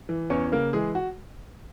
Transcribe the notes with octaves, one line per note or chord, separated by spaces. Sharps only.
E3
E2 C#4 C#5
C#3 A#3 A#4
E3 G#3 G#4
F#4